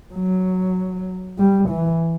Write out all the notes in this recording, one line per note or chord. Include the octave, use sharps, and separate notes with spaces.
F#3
G3
E3